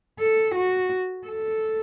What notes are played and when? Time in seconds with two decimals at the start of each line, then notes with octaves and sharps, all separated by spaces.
0.19 A4
0.56 F#4
1.27 A4